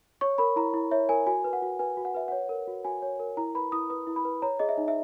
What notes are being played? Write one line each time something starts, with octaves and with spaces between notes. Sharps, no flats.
C#5 C#6
A#4 B5
E4 A#5
E4
C#5 E5
A#4 G#5
F#4 G#5
B4
F#5
F#4
B4 G#5
F#4
F#5
B4 E5
C#5 F#5
A#4
F#4
F#4 G#5
C#5
A#4
E4 A#5
B4 B5
E4 D#6
B4 D#6
E4
B5
B4
C#5 A#5
G#4 D#5
E5
D#4
E5